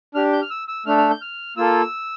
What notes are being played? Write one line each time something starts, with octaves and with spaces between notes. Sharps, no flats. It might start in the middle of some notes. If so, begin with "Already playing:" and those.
D4 G4 F6
G6
F6
E6
E6
A3 D4 A4 F6
F6
G6
F6
A#3 F4 A4 E6